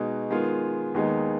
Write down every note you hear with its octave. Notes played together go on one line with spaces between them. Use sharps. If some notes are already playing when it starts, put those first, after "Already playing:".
Already playing: B2 G#3 D#4 F#4
D#3 G#3 B3 F4
D#2 D#3 G#3 B3 D#4